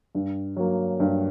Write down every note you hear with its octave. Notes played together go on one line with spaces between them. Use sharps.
G2
F#3 A#3
G2